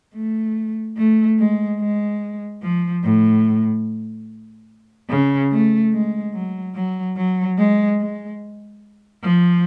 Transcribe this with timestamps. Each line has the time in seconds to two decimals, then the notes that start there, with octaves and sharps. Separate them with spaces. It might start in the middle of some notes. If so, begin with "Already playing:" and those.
0.14 A3
0.97 A3
1.38 G#3
1.79 G#3
2.62 F3
3.03 A2
5.10 C#3
5.51 A3
5.93 G#3
6.34 F#3
6.75 F#3
7.16 F#3
7.58 G#3
7.99 G#3
9.23 F3